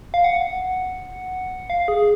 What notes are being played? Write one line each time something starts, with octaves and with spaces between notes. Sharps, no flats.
F5
F#5
F5
G#4